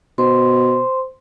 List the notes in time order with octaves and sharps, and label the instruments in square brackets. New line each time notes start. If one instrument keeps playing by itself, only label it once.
[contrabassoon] B2 [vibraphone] C5 C6